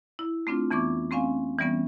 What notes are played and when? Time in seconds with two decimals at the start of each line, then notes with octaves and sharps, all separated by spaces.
0.19 E4
0.47 A3 C4 D4 F4
0.71 F2 E3 B3 C#6 D6
1.11 A3 C4 C#4 F5 G#5
1.58 E3 G3 B3 C#4